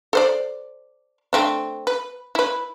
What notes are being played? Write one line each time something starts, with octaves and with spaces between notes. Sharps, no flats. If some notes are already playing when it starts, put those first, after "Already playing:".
A4 C5 D5
A3 C4 D4
B4
E4 B4